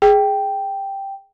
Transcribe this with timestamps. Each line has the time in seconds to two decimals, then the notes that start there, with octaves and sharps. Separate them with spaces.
0.02 G#4 G5